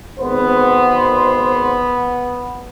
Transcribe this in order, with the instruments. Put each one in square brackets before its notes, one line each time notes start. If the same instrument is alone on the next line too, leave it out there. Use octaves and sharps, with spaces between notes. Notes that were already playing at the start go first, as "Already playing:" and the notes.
[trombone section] G#1 C5 [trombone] B3